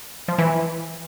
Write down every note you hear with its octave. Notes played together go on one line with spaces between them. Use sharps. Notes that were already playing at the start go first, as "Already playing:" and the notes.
F3
E3